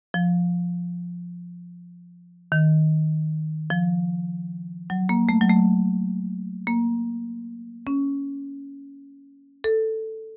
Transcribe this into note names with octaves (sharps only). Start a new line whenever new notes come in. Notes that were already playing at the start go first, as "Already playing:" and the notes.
F3
D#3
F3
F#3
A#3
A3
F#3
A3
A#3
C#4
A4